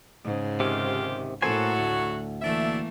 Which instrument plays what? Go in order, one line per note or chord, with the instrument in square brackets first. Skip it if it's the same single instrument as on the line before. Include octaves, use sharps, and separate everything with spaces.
[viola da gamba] G#2 C#3
[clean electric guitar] C3 D#3 [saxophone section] G#3 F4 G4
[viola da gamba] A2 A4 [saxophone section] F#3 F#4 [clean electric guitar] A#3 C5 G#5
[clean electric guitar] D2
[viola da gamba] E3 A3 A#3 [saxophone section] D4 E5